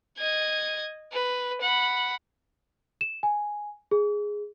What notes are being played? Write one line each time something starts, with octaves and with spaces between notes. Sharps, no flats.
D#5 G#6
B4
F#5 B5
E7
G#5
G#4